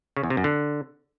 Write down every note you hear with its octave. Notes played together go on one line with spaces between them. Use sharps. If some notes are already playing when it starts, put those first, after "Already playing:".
C#3
E2
C3
F#2
D3